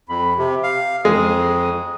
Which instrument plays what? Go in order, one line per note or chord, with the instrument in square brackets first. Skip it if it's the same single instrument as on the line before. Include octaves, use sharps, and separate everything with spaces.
[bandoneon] F2 [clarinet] B5
[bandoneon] C3 [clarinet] G4
[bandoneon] F5
[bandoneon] F2 [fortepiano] G#3 [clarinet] D#6